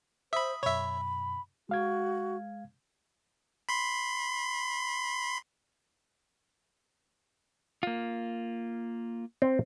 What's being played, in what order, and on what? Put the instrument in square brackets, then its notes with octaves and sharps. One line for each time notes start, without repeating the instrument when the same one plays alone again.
[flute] C5 [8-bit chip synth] E5 B5 [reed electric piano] D#6
[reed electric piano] F#2 B2 [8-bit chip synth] C#5 E5 [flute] B5
[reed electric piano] G#3 F5 G#6 [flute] F#4
[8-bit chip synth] B5 C6
[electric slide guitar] A#3 F4
[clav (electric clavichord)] C4